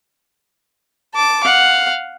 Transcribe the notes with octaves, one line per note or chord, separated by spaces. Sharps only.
A5 D6
F5 F#5